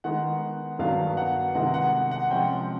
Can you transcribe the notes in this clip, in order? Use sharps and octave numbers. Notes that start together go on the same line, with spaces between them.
D#3 G#3 B3 F#5
G2 D#3 F#3 B3 F5
F#5
C3 D#3 G#3 B3 F#5
F#5
F#5
C3 F3 G#3 C#4 G5